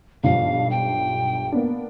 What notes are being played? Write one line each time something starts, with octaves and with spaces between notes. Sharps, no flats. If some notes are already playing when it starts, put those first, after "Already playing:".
B1 G2 F3 F5
G5
A#3 B3 D4